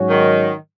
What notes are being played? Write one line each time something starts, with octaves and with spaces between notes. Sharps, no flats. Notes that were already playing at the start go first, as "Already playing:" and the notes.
Already playing: G#2 F#3 C#4 F#4 C#5
D#3